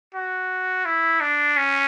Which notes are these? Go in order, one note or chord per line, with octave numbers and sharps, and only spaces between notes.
F#4
E4
D4
C#4